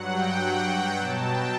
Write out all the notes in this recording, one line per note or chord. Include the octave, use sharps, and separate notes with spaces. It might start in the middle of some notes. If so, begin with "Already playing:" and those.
Already playing: G2 F#3 F#5
G5
B2 F#3 A5
G5